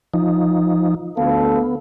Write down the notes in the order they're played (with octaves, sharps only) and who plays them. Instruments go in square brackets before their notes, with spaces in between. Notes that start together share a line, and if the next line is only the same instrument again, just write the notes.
[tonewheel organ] F3 D#4
[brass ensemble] D2 A4 F5 [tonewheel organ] B3